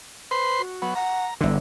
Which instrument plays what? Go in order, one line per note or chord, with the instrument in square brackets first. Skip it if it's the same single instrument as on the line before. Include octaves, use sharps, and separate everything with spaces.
[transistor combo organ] B4 C5 C6
[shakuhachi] F#4
[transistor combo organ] F#3 B3
[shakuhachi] F#5 [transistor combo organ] A#5
[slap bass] G1 D3 [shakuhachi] E4